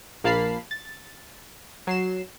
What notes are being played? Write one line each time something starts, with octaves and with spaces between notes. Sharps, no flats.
A#1 A#3 F5 A5 B5 C7
A6
F#3 C7 E7